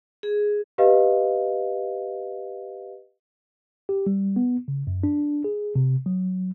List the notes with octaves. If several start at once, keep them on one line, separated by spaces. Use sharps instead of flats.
G#4
G4 B4 D#5 F5
G4
G3
B3
C#3
F#2
D4
G#4
C3
F#3